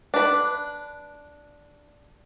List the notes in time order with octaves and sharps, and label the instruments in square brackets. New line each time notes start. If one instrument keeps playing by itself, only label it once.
[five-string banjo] D4 B4